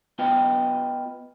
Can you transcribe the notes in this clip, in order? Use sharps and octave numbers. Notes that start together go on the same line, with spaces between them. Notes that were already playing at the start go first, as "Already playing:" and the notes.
B3 F4 B4 D#5 G5